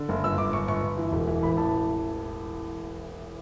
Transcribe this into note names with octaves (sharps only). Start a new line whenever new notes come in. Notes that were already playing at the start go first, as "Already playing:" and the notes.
Already playing: D3
F#1
G1 E6
G1 D6
G1 C#6
G1 C#6
G1
E3
E1
E3
A1 B5
A1 A5